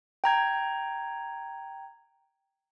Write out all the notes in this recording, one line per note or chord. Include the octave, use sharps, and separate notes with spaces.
G5 A#5 G#6